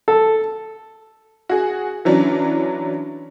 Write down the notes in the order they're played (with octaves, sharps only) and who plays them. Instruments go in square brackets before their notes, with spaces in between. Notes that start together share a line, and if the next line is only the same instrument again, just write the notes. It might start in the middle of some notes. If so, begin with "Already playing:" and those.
[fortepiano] A4
[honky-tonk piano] F#4 G#4
E3 F#3 C#4 D4